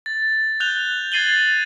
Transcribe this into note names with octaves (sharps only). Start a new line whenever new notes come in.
A6
F#6 G6 F7 G7
G#6 A6 C7 D#7 F#7 G7